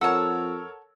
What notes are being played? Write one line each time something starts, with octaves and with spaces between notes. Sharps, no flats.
F2 A4 A#4 C#5 F#5 A5 E6